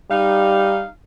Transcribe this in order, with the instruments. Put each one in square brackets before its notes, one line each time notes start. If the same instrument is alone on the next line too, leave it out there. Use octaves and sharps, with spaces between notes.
[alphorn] G3 [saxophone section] D#4 F5